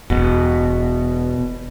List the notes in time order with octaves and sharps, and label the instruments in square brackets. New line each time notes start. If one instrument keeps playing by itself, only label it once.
[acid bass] E1 [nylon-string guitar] B2